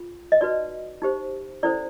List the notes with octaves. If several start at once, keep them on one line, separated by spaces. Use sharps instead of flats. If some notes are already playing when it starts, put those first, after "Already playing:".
Already playing: F4 G#4
D#5
D#4 F#4 B4 D5
D#4 G4 C5
C#4 E4 A4 C5 D5